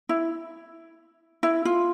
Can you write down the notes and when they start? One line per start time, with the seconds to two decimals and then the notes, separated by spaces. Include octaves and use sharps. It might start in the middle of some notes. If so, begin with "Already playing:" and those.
0.09 E4
1.43 E4
1.65 F4